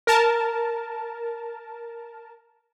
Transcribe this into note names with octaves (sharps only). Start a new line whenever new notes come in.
A#4 A5